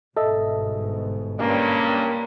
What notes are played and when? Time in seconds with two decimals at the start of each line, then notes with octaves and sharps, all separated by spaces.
0.17 G1 G#2 B2 A4 D#5 E5
1.39 G2 A#3 C#4